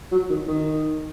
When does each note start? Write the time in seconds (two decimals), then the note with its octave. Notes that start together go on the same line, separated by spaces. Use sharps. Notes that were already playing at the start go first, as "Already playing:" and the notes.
0.12 F#3
0.30 D#3
0.48 D#3